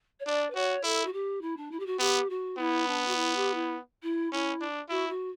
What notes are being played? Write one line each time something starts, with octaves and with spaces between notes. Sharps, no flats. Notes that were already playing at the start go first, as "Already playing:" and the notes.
C#5
D4 D5
B4
F#4 C#5
E4 A4
F#4
G4
E4
D4
E4
G4
F#4
B3 G4
F#4
B3 E4
D4
F#4
E4
G4
E4
E4
C#4 E4
D4
E4 F#4
F#4